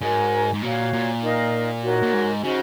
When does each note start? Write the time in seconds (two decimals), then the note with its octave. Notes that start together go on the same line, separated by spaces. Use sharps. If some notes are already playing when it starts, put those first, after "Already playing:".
0.01 G#2 F#4 A#4 C#5 G#5
0.53 G#2
0.62 A#2 F#4 C#5 F5
0.93 A#2
1.22 D#4 A#4 F5
1.83 D#4 F#4 A#4 C#5
2.02 A#2
2.13 G#2
2.43 C#3 D#4 F#4 C5 D#5